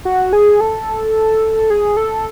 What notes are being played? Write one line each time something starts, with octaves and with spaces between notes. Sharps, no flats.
F#4
G#4
A4
G#4
A4